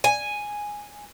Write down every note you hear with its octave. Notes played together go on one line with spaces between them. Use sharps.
G#5